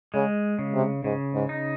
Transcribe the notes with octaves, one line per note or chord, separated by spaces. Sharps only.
C#3 G#3
C#3
C3
G#2 C#3
G#2
D#4